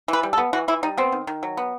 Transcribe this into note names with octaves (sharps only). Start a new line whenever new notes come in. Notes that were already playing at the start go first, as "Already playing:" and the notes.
E3 B4
G3
A4
B3
E3 F#4
E3 E4
G3 D#4
B3 C4
D#3
D#3
F#3
B3